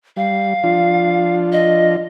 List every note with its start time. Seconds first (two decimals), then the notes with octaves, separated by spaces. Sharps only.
0.17 G3 F5
0.64 F3 D4 F4
1.52 D#5